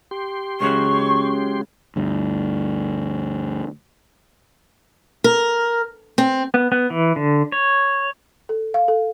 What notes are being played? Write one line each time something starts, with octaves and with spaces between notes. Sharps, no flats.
G4 C6
C#2 C#3 F#3 C#6
D2 G2
A#4
C4
B3
B3
E3
D3
C#5
A4
F5
A4